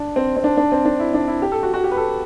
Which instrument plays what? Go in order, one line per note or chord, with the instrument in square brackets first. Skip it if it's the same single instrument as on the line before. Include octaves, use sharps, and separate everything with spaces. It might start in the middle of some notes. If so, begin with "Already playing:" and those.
Already playing: [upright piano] D4
C4
C4
D4
D4
C4
D4
E4
D4
E4
G4
A4
F#4
F#4
G4
B4
A4